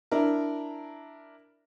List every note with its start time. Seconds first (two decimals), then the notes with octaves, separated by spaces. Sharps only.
0.11 D4 E4 A#4